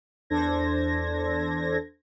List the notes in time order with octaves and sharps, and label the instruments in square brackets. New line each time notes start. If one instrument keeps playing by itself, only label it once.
[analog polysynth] E2 D4 A4 C5 G#6 A#6